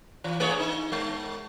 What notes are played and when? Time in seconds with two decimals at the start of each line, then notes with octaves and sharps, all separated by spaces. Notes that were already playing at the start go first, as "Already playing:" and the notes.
0.24 E3
0.40 A3 G#4 C#5
0.59 D#4
0.92 G#3